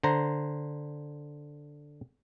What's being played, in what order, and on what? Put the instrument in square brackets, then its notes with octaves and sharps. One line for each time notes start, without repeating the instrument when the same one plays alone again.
[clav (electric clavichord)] D3 C5 A#5